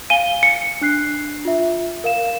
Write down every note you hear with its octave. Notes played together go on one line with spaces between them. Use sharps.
F5 G#5 D#7 G7
C#7
D4 F#6 C7
F4 E5
A#4 F5 E7